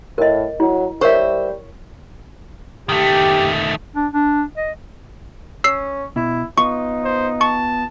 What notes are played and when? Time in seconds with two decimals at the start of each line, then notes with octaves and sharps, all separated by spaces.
0.18 A2 A#4 D#5
0.60 F#3 E4
1.01 G3 A#4 C5 C#5 E5 C#6
2.89 D#3 A3 G4
3.96 D4
4.13 D4
4.57 D#5
5.64 C#4 E6 C7
6.16 B2 E4
6.58 B3 D#4 F4 C#6
7.04 C5
7.41 A5 C#6